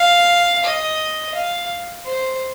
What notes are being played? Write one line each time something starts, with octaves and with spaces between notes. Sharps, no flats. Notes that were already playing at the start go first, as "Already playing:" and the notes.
Already playing: F5
D#5
F5
C5